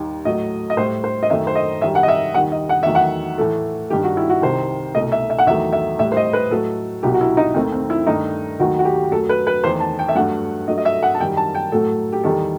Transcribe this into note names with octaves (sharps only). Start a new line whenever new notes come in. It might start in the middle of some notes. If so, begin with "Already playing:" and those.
Already playing: D#2 D#3 G3
A2 F#3 A3 D#5
D#5
A2 G3 C5
C5
D#5
F#2 D#3 A3 E5
C5
D#5
F#2 D#3 G3 E5
F#5
D#5
E5
D#2 D#3 G3 F#5
D#5
F#5
E2 D#3 F#3 A3 E5
F#5
A2 E3 A3 A4
G2 D#3 G3 G4
F#4
E4
F#4
C2 C3 D#3 C5
C2 B2 A3 D#5
E5
E5
F#5
E2 D#3 F#3 A3 E5
E5
A2 G3 E5
C5
D#5
B4
A2 F#3 A3 A4
C2 B2 F#3 G4
F#4
E4
D#4
D#2 D#3 A3 C4
C4
E4
G2 D#3 A3 D#4
D#2 D#3 F#3 A3 F#4
F#4
G4
F#2 F#3 A3 A4
B4
B4
E2 D#3 A3 C5
A5
G5
E5
G2 F#3 A3 F#5
G2 F#3 A3 D#5
D#5
E5
F#5
A5
F#2 D#3 G3 G5
A5
G5
A2 F#3 A3 A4
G4
E2 D#3 G3 A4